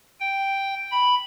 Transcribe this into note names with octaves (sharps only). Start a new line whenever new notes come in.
G5
B5